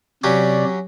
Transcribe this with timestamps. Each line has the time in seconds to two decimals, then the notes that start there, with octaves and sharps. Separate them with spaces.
0.24 C3 F#3 C#4 G4 D5